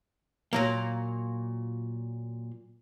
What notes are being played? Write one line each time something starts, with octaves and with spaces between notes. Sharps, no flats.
A#2 F#3 A#3